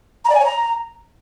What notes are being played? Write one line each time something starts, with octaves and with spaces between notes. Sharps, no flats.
A#5
D5
G#5
C#5
A#5